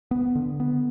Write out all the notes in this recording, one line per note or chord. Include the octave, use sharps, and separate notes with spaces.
B3
D3
B3